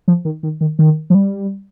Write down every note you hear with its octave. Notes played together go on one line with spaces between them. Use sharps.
F3
D#3
D#3
D#3
D#3
F3
G3